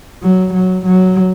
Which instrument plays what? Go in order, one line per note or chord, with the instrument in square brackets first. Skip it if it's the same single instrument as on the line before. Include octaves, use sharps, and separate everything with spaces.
[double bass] F#3
F#3
F#3